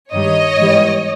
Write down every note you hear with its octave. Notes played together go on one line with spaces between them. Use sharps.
G2 D#3 G3 C#5 D#5
G#2 E3 G3 B3